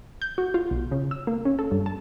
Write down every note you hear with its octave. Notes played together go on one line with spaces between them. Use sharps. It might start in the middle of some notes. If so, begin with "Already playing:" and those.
G6
F#4
F4
B1
C#3
E6
A#3
C#4
A4
G2
A5